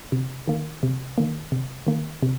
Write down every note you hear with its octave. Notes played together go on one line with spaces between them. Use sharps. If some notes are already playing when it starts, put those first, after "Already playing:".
C3
D#3 A#3
C3
D#3 A#3
C3
D#3 A#3
C3